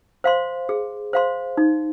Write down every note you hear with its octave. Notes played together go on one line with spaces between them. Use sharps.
C5 F5 C6
G#4
C5 F5 C6
D#4